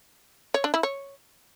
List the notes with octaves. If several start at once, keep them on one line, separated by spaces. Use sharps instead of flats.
C#5
D4
E4
C#5